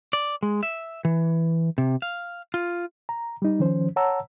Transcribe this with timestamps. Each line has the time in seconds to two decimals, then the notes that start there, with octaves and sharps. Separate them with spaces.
0.13 D5
0.43 G#3
0.63 E5
1.05 E3
1.78 C3
2.02 F5
2.54 F4
3.09 A#5
3.42 G3 D#4
3.59 D#3 F3 C#4 C5
3.96 C#5 F#5 A5 A#5 E6